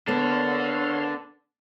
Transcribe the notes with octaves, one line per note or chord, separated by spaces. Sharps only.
D3 A#3 B3 D4 A4 C#5 C6 F6